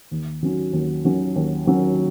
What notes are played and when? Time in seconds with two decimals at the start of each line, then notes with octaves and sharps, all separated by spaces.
0.11 D#2
0.42 D#3 F#3 C#4 F#4
0.73 D#2
1.04 D#3 F#3 C#4 F#4
1.36 D#2
1.66 D#3 F#3 C#4 F#4